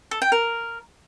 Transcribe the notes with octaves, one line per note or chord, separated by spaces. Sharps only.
A4
G5
A#4